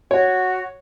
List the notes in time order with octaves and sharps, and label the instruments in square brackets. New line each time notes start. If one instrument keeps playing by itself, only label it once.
[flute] F#4 [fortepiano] C#5